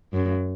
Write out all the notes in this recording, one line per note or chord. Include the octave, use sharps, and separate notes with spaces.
F#2